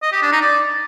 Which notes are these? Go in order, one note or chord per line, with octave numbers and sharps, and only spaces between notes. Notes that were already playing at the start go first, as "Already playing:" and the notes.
D#5
G4
D4
D#4
D5